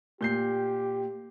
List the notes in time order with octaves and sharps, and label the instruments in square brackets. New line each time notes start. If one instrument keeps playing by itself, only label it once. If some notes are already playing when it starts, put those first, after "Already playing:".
[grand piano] A#2 G6 C7 [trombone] G4